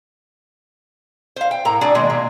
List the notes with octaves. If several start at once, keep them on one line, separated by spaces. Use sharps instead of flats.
C5 F5
G5
A2 A#4 A#5
D4 F#4 G#4 D5
B2 D#3 G#3 A#3
A#2